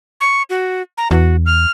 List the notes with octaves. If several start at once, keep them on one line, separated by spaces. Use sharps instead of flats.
C#6
F#4
A#5
E2 F#4
F6